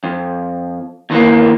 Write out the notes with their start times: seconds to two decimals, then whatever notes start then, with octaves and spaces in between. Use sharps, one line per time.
0.04 F2
1.10 E2 D#3 E3 A#3